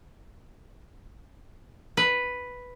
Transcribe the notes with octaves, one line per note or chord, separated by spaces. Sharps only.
B4